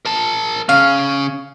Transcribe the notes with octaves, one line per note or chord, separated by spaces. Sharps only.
A#4 A5
C#3 C#4 F5